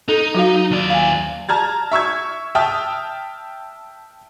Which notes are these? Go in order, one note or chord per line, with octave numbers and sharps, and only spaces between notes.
D#4 A4
F#3 F#4 F5
D#2 D5
F5 G#5
A5 A#5 F6 G#6 A6
E5 C#6 E6 G#6
E5 G5 A5 D#6 F6